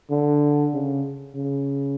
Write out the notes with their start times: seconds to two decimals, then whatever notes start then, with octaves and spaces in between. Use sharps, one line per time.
0.10 D3
0.73 C#3
1.35 C#3